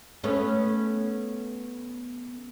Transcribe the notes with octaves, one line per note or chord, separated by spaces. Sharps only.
A3 B3 C#4